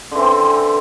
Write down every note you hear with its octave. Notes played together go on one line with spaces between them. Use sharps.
D3 E3 C4